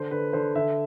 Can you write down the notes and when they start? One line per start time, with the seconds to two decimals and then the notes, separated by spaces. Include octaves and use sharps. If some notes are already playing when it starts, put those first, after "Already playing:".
Already playing: D3 C5
0.11 D3 B4
0.33 D3 C5
0.55 D3 E5